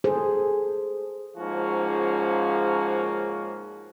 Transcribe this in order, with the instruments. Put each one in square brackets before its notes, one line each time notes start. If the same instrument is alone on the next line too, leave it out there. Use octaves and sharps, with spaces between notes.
[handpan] G#4 A4 C5
[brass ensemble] G#2 C#3 F3 A#3 C#4 F#4